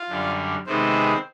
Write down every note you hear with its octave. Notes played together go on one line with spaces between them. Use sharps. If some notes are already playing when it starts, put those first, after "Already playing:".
Already playing: F4 F5
F#2 D3 G3
C3 D#3 G#3 B3 C4 C5